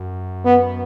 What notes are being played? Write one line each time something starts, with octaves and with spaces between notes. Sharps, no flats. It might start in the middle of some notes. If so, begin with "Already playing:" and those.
Already playing: F#2
B3